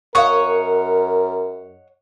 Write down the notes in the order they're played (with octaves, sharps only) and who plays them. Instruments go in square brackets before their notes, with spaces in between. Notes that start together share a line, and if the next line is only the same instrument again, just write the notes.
[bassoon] F#2 [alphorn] A#4 [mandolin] C#5 D#5 F#5 [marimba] F5 C#6